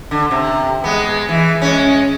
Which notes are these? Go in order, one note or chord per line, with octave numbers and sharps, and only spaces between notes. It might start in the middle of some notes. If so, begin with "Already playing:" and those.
D3
C3
G#3 B3
E3
G#3 C#4